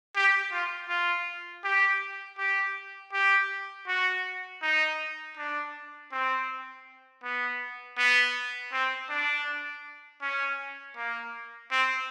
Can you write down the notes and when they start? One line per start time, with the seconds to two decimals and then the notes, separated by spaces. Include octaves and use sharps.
0.15 G4
0.52 F4
0.89 F4
1.64 G4
2.38 G4
3.13 G4
3.87 F#4
4.62 D#4
5.37 D4
6.12 C4
7.23 B3
7.98 B3
8.73 C4
9.10 D4
10.22 C#4
10.96 A#3
11.71 C4